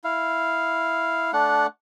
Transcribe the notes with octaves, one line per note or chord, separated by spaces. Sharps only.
E4 F5
A3 D4 F#5